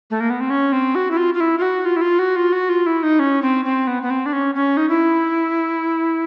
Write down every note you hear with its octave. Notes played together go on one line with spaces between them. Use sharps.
A3
A#3
B3
C4
C#4
C4
F#4
E4
F4
F4
E4
F4
F#4
F4
E4
F4
F#4
F4
F#4
F4
E4
D#4
C#4
C4
C4
B3
B3
C4
D4
C#4
C#4
D#4
E4